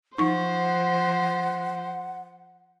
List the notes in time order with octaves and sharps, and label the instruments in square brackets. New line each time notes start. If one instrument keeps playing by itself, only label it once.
[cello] F3 [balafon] D#4 C#6 [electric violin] C5 [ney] F#5